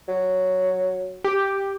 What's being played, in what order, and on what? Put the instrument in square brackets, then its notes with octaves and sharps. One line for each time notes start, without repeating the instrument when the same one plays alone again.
[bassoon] F#3
[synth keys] G4